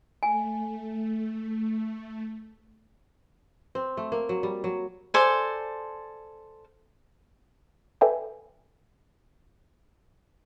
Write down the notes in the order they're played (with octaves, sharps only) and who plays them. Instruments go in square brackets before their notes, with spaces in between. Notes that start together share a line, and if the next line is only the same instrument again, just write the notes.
[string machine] A3 [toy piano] G#5
[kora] C4
A3
A#3
F#3
G3
F#3
[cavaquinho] A4 C5 D5 G#5
[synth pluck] A4 B4 D5 E5 G5 G#5